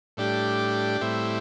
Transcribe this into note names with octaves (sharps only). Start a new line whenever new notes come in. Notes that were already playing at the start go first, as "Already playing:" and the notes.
A2 G3 D4 G4
A2 G3 C4 E4